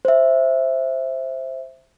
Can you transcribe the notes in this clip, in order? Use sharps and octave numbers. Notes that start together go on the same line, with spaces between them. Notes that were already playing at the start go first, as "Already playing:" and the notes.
C5 E5